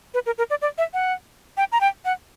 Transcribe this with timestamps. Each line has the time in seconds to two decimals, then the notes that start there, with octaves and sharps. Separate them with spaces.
0.14 B4
0.26 A#4
0.38 A#4
0.50 D5
0.62 D5
0.78 E5
0.94 F#5
1.57 G5
1.72 A#5
1.81 G5
2.05 F#5